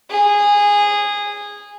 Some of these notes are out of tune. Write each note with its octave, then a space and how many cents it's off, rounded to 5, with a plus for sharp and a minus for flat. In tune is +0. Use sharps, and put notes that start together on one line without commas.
G#4 -15